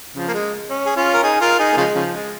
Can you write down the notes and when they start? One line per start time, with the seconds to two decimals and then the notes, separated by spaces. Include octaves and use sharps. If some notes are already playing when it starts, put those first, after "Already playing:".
0.16 C#3 F3
0.28 A#3
0.34 G#3
0.70 C#4
0.86 G#4
0.96 C#4 F4
1.14 A#4
1.23 D#4 G#4
1.41 F4 A#4
1.59 D#4 G#4
1.72 A#3
1.77 C#3 F3 G#3
1.95 C#3 F3
2.12 G#3